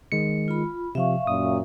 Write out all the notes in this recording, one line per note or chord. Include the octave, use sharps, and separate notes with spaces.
D#3 G#3 C#7
F4 B5
C3 F3 E5 F5 C#6
F#2 A#2 D#6